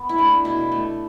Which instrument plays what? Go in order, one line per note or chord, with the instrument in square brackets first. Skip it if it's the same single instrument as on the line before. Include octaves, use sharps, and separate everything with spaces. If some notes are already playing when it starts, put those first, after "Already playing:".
Already playing: [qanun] B3
E4
A3 D4
B2 E4
A3